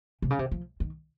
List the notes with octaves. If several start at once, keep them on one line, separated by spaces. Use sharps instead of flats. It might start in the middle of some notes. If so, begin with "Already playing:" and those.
C3
C#3
C3
F3
D#3